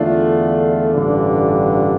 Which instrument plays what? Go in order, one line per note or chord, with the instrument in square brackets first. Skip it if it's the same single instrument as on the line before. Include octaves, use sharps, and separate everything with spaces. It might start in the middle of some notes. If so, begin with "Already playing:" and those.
Already playing: [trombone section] E2 D3 A3 [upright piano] D4 F4
[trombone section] A1 G2 D3